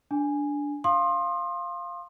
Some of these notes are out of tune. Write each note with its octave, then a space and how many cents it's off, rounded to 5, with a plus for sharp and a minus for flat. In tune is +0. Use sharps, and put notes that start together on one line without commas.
D4 -10 G#5 -5
F5 +0 C6 +25 D#6 -35